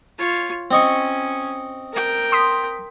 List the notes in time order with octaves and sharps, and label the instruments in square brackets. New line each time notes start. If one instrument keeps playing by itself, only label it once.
[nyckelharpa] F4 C#5
[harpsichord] C4 D#5 C#6 [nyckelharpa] C#4
[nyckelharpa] A#4 G5
[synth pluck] C6 D#6 B6